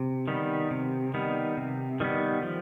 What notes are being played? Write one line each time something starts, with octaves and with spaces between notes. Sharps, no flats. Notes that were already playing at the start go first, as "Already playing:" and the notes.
Already playing: C3
D#3 G3 B3
C3
D#3 G3 B3
C3
D#3 G3 B3
F3